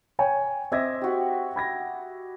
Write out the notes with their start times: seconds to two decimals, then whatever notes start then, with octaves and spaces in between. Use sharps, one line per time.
0.19 C#5 G5 G#5
0.72 C4 D#5 E5 D6 G#6 A#6
1.01 F#4 G4
1.56 B5 G#6 A#6